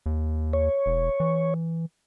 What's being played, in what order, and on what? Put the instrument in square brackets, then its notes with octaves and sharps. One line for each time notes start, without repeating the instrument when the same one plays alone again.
[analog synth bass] D#2
[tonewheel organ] C#5
[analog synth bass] E1
E3